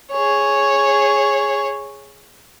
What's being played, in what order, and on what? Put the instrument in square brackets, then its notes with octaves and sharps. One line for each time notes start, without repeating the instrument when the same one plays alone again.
[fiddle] G#4 C#5